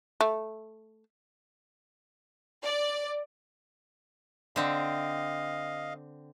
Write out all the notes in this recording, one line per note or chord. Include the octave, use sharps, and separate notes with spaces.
A3
D5
D3 C4 D#5 F5